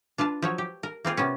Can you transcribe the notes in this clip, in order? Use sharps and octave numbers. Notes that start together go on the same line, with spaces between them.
D4 F4 B4 A5
F3 F#3 C#5
G4
A#4
A#3 C4 F4 G#4
C3 B3 C#4